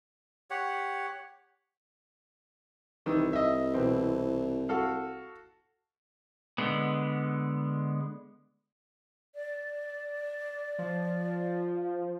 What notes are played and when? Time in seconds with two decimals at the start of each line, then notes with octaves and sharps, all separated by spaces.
0.50 G4 C#5 F#5
3.06 C2 D#3 E3
3.33 D#5 E5
3.74 B2 E3 C4
4.69 F#4 A4 F5
6.58 D3 G#3 B3
9.35 D5
10.79 F3